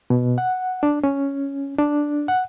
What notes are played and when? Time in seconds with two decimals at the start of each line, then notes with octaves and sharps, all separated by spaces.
0.10 B2
0.38 F#5
0.83 D4
1.04 C#4
1.79 D4
2.28 F#5